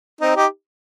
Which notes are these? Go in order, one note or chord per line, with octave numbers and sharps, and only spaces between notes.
C4 D#4
D#4 G4